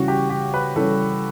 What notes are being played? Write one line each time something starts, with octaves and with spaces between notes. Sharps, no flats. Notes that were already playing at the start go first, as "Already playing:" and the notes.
Already playing: C#3 E3 G3 C#4 F#4
G4
G4
B4
C#3 E3 G3 C#4 A4